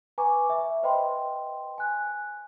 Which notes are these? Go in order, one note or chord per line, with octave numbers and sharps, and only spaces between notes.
B4 G#5 A#5 C#6 D6
E5
B4 C5 D#5 G5 B5 C6
G#5 F#6